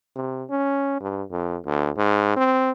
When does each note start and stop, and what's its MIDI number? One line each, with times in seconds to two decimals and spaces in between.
0.16 0.44 48
0.50 0.99 61
1.00 1.23 43
1.31 1.57 41
1.66 1.90 38
1.97 2.35 44
2.36 2.71 60